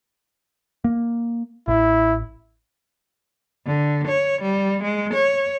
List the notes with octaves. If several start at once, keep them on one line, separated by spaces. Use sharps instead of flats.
A#3
A1 E4
D3
C#5
G3
G#3
C#5